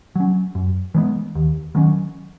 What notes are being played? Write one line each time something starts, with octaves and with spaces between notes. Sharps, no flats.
F#3 C#4
F#2
E3 G#3 B3
D#2
D#3 F#3 C#4